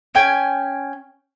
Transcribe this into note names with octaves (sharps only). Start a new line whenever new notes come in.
C#4 G5 G#5